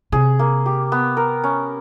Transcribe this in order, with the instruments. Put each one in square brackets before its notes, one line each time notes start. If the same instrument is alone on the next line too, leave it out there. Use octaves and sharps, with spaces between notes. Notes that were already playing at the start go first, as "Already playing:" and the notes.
[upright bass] C3 [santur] G#4
[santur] A#3
G4
B3
A#4
C#4